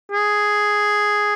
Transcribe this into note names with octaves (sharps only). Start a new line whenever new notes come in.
G#4